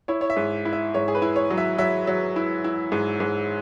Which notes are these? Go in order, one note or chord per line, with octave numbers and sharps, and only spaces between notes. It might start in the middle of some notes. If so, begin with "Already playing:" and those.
E4 C#5
C#5
E5
G#2
E4
E5
G#2 C#5
G#4
B4
E4
C#5
F#3
E5
F#3 E5
F#3
E4
E4
G#2
G#2